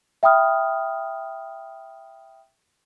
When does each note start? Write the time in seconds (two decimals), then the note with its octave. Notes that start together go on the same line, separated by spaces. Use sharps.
0.23 E5 G5 B5 D#6 F6